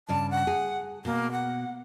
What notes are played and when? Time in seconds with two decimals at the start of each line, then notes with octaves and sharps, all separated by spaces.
0.09 G2 C#3 D5 A5
0.31 F#5
0.47 G#4
1.05 B2 A#3
1.32 F#5